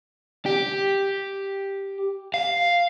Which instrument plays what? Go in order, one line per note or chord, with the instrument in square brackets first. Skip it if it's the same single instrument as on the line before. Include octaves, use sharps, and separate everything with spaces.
[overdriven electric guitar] G4
F5